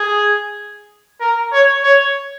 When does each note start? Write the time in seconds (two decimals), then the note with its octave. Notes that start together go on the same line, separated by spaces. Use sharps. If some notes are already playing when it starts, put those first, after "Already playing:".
Already playing: G#4
1.20 A#4
1.52 C#5
1.84 C#5